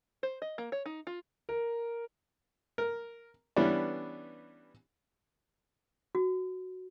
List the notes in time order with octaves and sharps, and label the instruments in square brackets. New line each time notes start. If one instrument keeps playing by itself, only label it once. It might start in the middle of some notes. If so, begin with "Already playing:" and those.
[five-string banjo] C5
D#5
A#3
C#5
D#4
F4
[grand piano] A#4
[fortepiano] A#4
E3 G3 B3 C#4 D4
[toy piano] F#4